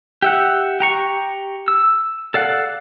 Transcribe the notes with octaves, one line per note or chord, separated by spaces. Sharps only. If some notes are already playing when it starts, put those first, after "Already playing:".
G4 E5 F#5
G4 A#5 C#6
E6
A4 D5 F5 F#5